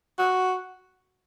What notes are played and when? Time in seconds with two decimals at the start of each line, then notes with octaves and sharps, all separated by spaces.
0.18 F#4